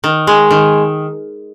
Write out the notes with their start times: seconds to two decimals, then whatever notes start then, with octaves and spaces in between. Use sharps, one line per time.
0.04 D#3
0.27 G#3
0.51 D#3